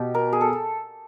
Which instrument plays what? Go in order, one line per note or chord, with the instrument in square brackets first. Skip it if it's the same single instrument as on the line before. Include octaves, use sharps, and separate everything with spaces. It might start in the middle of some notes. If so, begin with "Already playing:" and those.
Already playing: [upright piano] B2 [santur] G4
[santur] A#4
G#4
A4